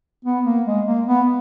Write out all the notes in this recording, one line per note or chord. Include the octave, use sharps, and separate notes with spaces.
B3
A#3
G#3
A#3
B3